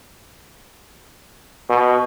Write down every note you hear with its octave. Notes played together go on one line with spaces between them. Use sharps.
B2